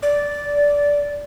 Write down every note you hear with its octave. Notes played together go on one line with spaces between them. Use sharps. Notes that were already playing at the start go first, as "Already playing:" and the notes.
D5